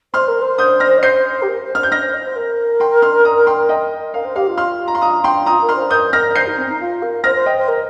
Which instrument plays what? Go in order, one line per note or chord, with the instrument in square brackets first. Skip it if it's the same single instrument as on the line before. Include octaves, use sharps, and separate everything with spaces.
[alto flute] C5 [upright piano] C6 F6
[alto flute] A#4
C5
[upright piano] D#6 G6
F6 A#6
[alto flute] D#5
[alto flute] C5 [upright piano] G6 C7
[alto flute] G4
A#4
C5
[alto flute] C5 [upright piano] F6
[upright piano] G6
[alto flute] D#5 [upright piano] F6 A#6
[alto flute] C5
D#5
C5
A#4
[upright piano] G5 C6
C6 F6
A#5 D#6
G5 C6
D#5 G5
[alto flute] A#4 [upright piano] F5
[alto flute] C5
[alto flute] G4 [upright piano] F5
[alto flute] F4
[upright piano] C6 F6
A#5
C6
A#5 D#6
G5 C6
[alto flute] F4 [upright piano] A#5 D#6
[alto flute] A#4
[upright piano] C6 F6
[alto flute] C5
[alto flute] A#4 [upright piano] D#6 G6
[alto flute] A#4 [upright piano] F6 A#6
[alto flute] C5 [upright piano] G6 C7
[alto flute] D#4
C4
D#4
F4
A#4
[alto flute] C5 [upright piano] F6 A#6
[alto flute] C5
[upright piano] D#5 G5
[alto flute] C5
A#4